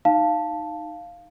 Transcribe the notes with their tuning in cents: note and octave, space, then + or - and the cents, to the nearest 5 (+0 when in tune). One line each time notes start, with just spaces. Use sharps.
D#4 +0 F5 +0 A5 +0